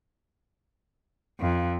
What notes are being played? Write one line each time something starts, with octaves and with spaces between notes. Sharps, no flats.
F2